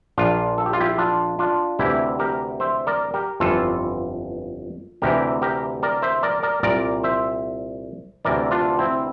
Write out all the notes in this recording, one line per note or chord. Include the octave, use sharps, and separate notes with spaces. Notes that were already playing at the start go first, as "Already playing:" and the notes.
A#1 A#2 D4 F4
A4
G4
F4
E4 G4
D4 F4
D4 F4
D2 C3 E3 E4 G4
G4 A#4
C5 E5
A#4 D5
G4 A#4
G1 F2 E3 F4 A4
D2 C3 E3 G4 A#4
G4 A#4
A#4 D5
C5 E5
A#4 D5
A#4 D5
C2 A#2 A#4 D5
C5 E5
D2 C3 E3 A#4 D5
D4 F4
C4 E4